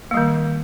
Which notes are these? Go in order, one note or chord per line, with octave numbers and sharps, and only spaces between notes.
D#3 G3 A#3